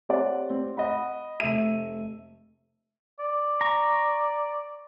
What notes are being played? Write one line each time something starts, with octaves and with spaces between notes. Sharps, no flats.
C4 G4 C#5 D5 F#5
C4
D#5 F#5 B5
F1 A3 E5 D#7
D5
A#5 C#6